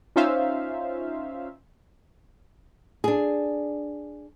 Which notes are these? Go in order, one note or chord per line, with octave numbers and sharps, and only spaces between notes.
C#4 D#4 F4 C5 E5 F5
D4 G#4